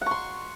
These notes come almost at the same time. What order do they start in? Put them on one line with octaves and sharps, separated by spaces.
F#5 C#6 C6